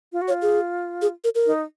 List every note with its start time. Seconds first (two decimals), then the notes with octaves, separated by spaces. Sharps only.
0.13 F4
0.22 F#4
0.28 C#5
0.31 F4
0.42 G#4
1.02 G#4
1.24 A#4
1.35 A#4
1.46 D#4